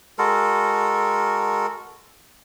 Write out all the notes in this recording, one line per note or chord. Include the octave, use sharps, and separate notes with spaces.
G#3 F#4 A4 A#4